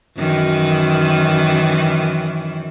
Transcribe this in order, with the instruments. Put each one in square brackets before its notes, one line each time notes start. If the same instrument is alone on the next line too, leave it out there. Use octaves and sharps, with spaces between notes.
[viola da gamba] F#2 D#3 E3